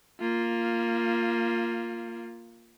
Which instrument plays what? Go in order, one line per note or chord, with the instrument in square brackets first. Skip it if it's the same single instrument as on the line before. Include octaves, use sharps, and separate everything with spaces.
[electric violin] A#3 F4